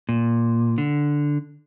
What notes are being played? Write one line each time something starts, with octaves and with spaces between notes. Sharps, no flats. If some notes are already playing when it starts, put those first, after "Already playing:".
A#2
D3